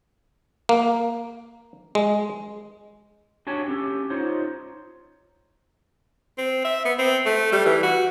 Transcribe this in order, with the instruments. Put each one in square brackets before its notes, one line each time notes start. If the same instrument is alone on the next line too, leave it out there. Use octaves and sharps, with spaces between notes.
[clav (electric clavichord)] A#3
G#3
[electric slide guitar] D4 F#4 G4 C#5 G#5
C#4 G4 A4
D#4 F4 C5 C#5
[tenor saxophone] C4
E5
B3
C4
A3
G3
E3
F#4